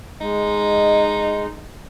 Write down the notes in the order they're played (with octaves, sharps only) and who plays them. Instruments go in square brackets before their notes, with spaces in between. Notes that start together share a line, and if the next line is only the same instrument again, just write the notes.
[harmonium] G#3 [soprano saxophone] D#4